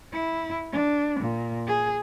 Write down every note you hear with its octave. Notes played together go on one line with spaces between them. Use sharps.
E4
D4
A#2
G#4